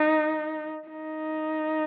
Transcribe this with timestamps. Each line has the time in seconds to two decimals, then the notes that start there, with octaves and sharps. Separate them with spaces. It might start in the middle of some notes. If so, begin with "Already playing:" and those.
Already playing: D#4
0.88 D#4